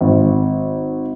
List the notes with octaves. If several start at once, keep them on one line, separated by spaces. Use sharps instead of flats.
G#1